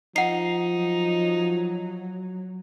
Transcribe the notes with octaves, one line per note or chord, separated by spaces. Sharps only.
F3 D#4 F#5 C7
F#3